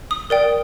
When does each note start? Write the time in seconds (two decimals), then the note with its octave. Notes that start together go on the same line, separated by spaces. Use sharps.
0.11 D#6
0.30 A#4 D5 G5